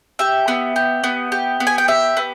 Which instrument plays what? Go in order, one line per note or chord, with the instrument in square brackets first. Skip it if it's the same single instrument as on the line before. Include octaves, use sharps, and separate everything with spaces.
[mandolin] G4 E5
B3
G4
B3
G4
B3
G#5
G5
G4 E5
B3